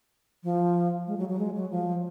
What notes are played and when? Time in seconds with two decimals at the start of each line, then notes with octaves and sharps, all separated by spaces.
0.43 F3
1.07 G#3
1.18 F#3
1.29 F#3
1.39 G#3
1.55 F#3
1.71 F3